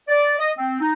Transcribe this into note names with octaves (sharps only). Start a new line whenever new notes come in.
D5
D#5
C4
D#4